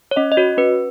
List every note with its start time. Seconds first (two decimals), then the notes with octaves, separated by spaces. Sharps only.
0.11 C#5
0.16 C#4 D#5
0.32 D#5
0.37 F#4 C#5
0.57 C#4 B4